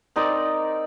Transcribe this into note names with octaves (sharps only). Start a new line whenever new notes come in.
C4 D#4 A#4 D5